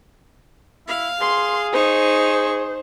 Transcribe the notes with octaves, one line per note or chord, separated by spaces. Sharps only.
E4 F5
G#4 C6
D#4 C5 C#6